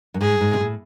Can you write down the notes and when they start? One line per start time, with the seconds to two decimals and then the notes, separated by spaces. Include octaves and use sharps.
0.14 F#2
0.21 G#2 G#4
0.41 G#2
0.53 C3
0.60 A2